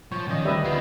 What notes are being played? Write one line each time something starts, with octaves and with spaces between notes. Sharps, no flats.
F3 C#5
D#3 C#4 D5 D#5
D2 G3 B4 D#5 E5
B3 E4 F4 C7